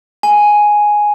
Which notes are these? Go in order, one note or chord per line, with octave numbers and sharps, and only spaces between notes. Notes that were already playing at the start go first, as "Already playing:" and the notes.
G#5